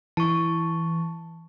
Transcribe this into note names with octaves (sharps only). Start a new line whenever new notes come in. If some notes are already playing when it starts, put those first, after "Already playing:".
E3 A5 C#6